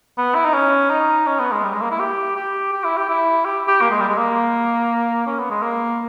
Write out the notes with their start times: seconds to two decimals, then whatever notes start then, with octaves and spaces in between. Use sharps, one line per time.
0.18 B3
0.35 E4
0.45 D#4
0.54 C#4
0.90 D#4
1.27 C#4
1.39 B3
1.52 G#3
1.64 G3
1.73 G#3
1.81 A#3
1.91 E4
2.00 G4
2.36 G4
2.72 G4
2.84 E4
2.97 G4
3.09 E4
3.45 G4
3.68 G4
3.81 A#3
3.90 G#3
4.00 G3
4.09 G#3
4.18 A#3
5.27 C#4
5.39 B3
5.51 G#3
5.63 A#3